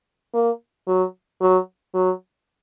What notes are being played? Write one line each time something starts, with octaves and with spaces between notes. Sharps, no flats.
A#3
F#3
F#3
F#3